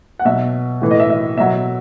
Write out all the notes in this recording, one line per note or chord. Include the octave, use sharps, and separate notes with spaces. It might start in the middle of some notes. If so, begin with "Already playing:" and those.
F#5
B2 F#3 E5
A2 E3
D#5
E5
E5
B2 F#3 E5